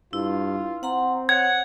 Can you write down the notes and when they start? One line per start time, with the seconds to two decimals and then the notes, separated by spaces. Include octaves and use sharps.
0.13 G2 E4 F4
0.83 C4 F#5 A#5 C6
1.29 C#5 F#5 G#6